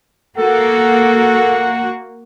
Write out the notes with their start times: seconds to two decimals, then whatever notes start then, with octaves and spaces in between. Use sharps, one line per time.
0.38 A#3 F#4 A4 F#5